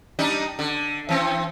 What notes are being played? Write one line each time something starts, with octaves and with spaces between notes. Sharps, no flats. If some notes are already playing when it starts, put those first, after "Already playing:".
G3 D4 D#4
D3
E3 C4